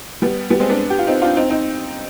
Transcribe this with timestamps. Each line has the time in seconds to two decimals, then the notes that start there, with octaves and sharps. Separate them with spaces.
0.22 G3 B3
0.50 G3 B3
0.60 G#3 C4
0.69 B3 D4
0.90 G4
0.99 F4
1.07 C4 D#4
1.22 D4 F4
1.37 C4 D#4
1.50 C4 D#4